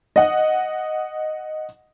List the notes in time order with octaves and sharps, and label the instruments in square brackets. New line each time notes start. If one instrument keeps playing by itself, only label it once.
[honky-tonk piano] D#5 F#5